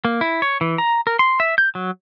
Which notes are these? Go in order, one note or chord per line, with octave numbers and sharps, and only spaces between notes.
A#3
E4
C#5
E3
A#5
A#4
C6
E5
G6
F#3